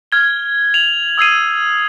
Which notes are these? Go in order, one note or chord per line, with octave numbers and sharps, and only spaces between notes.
F6 G#6 G7
F7 F#7
D#6 E6 G#6 C7 D#7